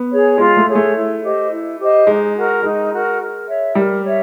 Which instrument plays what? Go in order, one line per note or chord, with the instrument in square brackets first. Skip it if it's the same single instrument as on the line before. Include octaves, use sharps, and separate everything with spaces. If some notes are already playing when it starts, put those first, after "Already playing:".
Already playing: [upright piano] B3
[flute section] G#4 C#5
[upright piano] G#3 [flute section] F4
[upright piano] A3
[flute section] G#4 C#5
[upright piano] A3
[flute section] E4
G4 C5 D#5
E4
G4 C5 D#5
[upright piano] G#3 [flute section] D#4
[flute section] F#4 A#4
[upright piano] G#3 [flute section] D#4
[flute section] F#4 A#4
A#4
C#5 E5
[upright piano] G3 [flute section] A#4
[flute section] C#5 E5